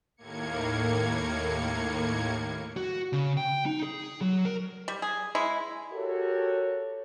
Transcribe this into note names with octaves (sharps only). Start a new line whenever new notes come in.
D#2 A2 A#3 G#6 C#7
F#4
C#3
G5
D#4
G#4
F#3
A#4
G3
G#4
G#3 E4
F#4 G4 A4 A#4 C#5